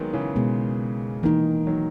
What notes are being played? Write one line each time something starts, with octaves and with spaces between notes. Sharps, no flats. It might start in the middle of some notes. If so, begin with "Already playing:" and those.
Already playing: D#3 F#3 G#3 A#3 B3
C#3 E3
B2 G#3 B3
D#3 E3 A#3 D#4
D#3 F#3